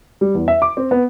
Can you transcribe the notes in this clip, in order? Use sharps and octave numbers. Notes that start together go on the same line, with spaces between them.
G3
E2
E5
D6
C4
B3